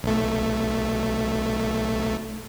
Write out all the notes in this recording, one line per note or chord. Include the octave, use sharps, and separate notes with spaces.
B1 A3